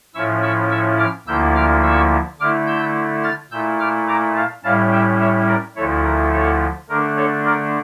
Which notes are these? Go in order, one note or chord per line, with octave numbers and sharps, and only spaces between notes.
A2 F3 C#4 E4 C#6 E6
C#6 E6
C#6 E6
D6 F6
D2 D3 F3 A#3 E4 E6 G6
D6 F6
C#6 E6
D3 A3 E4 D6 F6
E6 G6
F6 A6
A#2 A3 E4 E6 G6
D6 F6
A#5 D6
F5 A5
A2 G3 C#4 E4 F5 A5
E5 G5
C#5 E5
A#4 D5
D2 D3 F3 A3 E4 A4 C#5
A#4
A4 C#5
D3 A3 D4 A#4
A4 C#5
A#4 D5